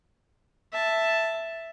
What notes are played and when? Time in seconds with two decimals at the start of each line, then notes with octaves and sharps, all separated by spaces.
0.73 E5 A5